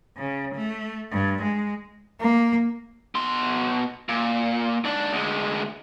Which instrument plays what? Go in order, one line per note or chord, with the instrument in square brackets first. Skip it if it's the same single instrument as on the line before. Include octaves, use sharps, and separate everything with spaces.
[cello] C#3
A3
G2
G#3
A#3
[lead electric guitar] B2 C6
A#2
G#2 D4
D2 G#3